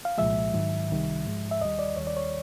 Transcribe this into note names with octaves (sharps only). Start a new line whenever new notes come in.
F5
C2 A#2 F3 G#3 E5
G#2 D#3 F#3
C2 C3 D#3 G3
G#2 F3 G#3
E5
D#2 D#3 G3 D#5
D5
D#2 D#3 G3 C#5
D5
C#5